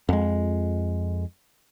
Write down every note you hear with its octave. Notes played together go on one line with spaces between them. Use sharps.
F2 G#3